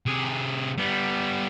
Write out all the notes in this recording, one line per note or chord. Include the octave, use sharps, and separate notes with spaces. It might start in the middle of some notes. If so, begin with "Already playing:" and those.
C3 G#4
G3 B3